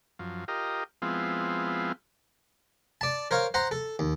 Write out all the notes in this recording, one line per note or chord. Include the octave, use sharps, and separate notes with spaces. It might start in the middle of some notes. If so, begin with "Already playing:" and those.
F#2 F3
F4 G4 A#4 D#5
F3 G#3 B3 C4 E4 F4
D5 A5
A#4 C5 C#5 F5
C5 F#5 A#5 C6
A4
D#2